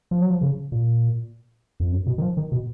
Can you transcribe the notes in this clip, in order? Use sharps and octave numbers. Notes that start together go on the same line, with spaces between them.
F3
F#3
F3
C#3
A#2
F2
F#2
B2
D#3
F3
D#3
B2